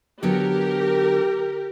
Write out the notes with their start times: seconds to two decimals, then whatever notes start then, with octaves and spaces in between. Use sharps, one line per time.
0.23 D3 F#3 B3 G4 A#4